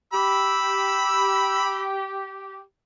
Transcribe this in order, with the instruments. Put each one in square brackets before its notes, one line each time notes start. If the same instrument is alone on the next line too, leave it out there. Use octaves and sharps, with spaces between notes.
[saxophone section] G4 [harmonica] B5 E6